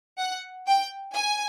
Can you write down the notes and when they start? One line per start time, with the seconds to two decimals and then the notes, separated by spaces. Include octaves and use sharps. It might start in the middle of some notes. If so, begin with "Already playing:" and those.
0.19 F#5
0.67 G5
1.14 G#5